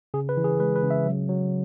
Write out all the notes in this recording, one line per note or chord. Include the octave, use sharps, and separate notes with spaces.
C#3 G#4
B4
E3
G#4
G#3 B4
B4
C#3
E5
F#3
F#3